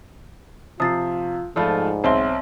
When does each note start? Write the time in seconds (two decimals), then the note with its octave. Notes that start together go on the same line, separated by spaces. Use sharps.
0.80 C3 F3 F4 D#6 A6 C7
1.56 G#2 F3 A3 F4 D5 A5 B5
2.04 B1 C4 C#5 E5 C6